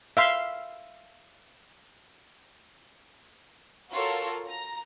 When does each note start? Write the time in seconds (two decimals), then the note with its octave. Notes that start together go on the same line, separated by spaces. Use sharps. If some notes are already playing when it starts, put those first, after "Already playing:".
0.17 E5 F5 C6
3.92 F4 F#4 A4 A#4 C#5
4.48 A#5